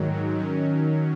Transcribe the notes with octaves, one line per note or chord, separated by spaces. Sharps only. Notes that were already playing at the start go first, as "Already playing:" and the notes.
Already playing: G#2 D#3 F#3
D#3 F#3 C#4